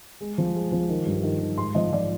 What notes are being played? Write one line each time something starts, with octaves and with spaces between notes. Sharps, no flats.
G#3
F3
G#3
F3
D#3
G2
D#3
D#3
G#2 C6
F3 D#5
F3 D5